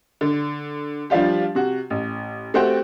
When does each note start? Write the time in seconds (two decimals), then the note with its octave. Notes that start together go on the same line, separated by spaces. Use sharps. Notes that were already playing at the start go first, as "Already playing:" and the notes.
0.21 D3
1.10 F3 G3 D4 F4 G4
1.55 C3 F#4
1.90 A1
2.54 A3 C4 F#4 G4 C5 G5